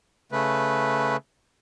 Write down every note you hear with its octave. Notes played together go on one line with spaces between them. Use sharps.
C#3 A3 B4